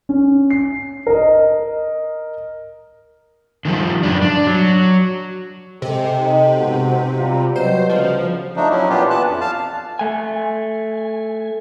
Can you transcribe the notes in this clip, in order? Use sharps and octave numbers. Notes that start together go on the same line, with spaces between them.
C#4
C7
A#4 D#5
D3 D#3 F3 G3
F#2 G3 D4
D4
F#3
C3 G#3 A4 G5
D#4
G#2 B2 F#4
G3 F4 A#5
B2 F#3 G3 C5
D2 C#3 F3
F3 A3 D4 D#4
F#3 C#4 E4
A#2 B3 D4 F4 G4
E3 B3 A5 F#6
F2
F5 A5
A3 G#5